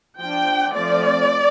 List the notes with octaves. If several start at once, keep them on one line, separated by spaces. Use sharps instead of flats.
F3 D4 G5
F3 A3 C4 D5